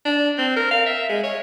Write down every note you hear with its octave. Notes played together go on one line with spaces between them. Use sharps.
D4
C4
A#4
F5
E5
G#3
C#5